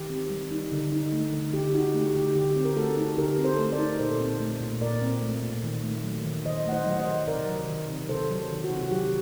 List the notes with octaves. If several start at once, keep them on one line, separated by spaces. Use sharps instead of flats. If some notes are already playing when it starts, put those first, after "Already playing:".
Already playing: D#3 G4
C4
G3
D#4
D3
D#4
A3
D3
D3 G4
D#4 F#4
A3 G4
D3 G4
D3 G4
C4
A#4
A3 F#4 A4
D#4
D3 G4 A#4
C4
A4 C5
A3
A#4 D5
D#4
A#2 A4 C5
C4
A3
A#2
A#2 A#4 D5
C4
A3
A#2
D#3
A3
F#3
D#3
D#3 C5 D#5
A3 F#5
C5 D#5
F#3 F#5
C5 D#5
D#3
C3 A#4 D5
F#3
D#3
C3
C3 A4 C5
F#3
D#3
F#4
C3
F#4
F#3 G4